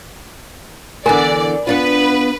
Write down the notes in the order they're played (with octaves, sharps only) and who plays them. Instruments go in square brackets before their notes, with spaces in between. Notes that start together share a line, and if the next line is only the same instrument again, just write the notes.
[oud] D3 E3 B3 [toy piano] A#4 G#5 A#5 [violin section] D5
[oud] B3 D4 F4 [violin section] B4